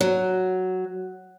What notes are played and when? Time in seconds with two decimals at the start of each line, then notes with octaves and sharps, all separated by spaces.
0.01 F#3